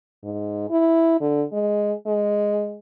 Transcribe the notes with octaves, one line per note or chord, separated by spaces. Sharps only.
G#2
E4
D3
G#3
G#3